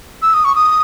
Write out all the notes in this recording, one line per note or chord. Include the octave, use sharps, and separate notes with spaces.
E6
D#6
C#6
D#6